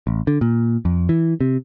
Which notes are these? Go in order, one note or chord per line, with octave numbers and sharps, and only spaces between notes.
A1
D3
A#2
F2
E3
C3